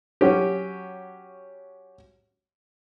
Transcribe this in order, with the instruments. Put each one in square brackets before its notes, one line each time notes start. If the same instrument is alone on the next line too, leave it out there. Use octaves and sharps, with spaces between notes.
[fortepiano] F#3 C#4 G4